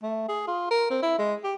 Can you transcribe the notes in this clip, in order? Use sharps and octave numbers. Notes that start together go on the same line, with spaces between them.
A3
G#4
F4
A#4
C4
E4
G#3
G4